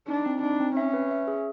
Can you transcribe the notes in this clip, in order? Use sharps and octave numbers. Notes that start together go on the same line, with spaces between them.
D4 D#4
C4
D4 D#4
C4
C#4 E5
B4
E5
G#4